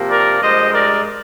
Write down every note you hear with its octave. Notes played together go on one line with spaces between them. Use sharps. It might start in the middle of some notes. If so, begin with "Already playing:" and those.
Already playing: C3 F3 A#3
A#4 D5
G2 F3 G#3 C5 D#5
A#4 D5